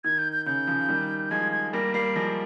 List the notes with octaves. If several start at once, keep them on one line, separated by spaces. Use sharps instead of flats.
D#3 G#6
G6
G6
C#3 G6
C#3 F3
D#3 G3
F3 G#3 G#6
G#6
G3 A#3 A#6
G3 A#3 C7
F3 G#3 A#6